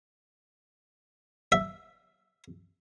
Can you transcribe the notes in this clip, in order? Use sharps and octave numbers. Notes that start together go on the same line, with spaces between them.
E5